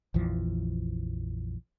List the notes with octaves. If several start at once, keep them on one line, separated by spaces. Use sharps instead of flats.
A#1 F2 E3 F3